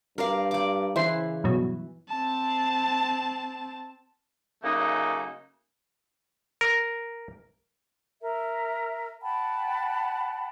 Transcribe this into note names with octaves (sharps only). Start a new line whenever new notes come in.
G2 A#4 D5 F5
D5 D6
C#3 E3 E4 C5 C7
G2 B2 F#3
C4 A5
C#3 F#3 A3 A#3 D#4
A#4
A#4 E5
F#5 G5 A5 B5